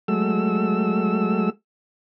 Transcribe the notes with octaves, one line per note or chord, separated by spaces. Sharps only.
F#3 G#3 A3 E6